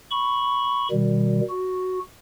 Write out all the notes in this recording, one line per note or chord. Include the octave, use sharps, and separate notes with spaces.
B5 C#6
B2 D#3 G3
F#4